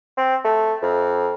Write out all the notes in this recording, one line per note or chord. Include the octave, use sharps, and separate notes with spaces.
C4
A3
F2